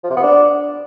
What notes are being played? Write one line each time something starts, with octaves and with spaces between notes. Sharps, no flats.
F3
C3
B3
D4